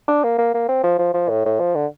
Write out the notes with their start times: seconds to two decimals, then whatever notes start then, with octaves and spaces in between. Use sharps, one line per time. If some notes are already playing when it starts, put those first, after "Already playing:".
0.08 D4
0.24 A#3
0.38 A#3
0.54 A#3
0.69 C4
0.83 F3
0.99 F3
1.14 F3
1.29 A2
1.45 A2
1.60 F3
1.75 D3